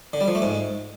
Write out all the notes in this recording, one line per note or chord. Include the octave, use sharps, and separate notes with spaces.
D3
G3
F3
A3
G#2